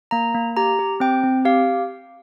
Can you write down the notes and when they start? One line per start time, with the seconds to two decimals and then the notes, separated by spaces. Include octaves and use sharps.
0.11 A#3 A#5
0.34 A#3
0.57 G4 A#5
0.79 G4
1.00 C4 G5
1.24 C4
1.45 G4 F5